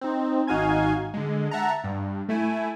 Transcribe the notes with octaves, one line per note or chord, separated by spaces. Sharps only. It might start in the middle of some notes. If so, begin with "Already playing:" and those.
C4 D#4
G#1 D#4 F#4 F5 G#5 G#6
D3 G#3
E5 F#5 A5 A#5
G2
A3 E4 G#5